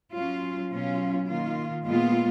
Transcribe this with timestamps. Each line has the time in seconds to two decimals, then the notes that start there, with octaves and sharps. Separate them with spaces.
0.13 F#3 C#4 F4
0.70 B2 F#3 C#4 F4
1.27 D#3 A#3 F4
1.84 A#2 G#3 B3 F4